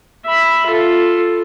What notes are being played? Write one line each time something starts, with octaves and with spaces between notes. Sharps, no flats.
E5 B5
F4 A4